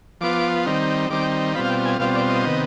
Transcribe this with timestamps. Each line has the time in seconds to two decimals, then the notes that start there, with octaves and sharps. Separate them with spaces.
0.21 F3 B3 F4 D6
0.66 D#3 G3 C4 D#4
1.10 D#3 G3 C4 D#4 D6
1.55 B2 G3 C4 F4 B5
1.65 F5
1.70 G5
1.85 G#5
1.99 B2 G3 C4 F4 F5
2.15 D5
2.29 D#5
2.44 C3 D#3 B3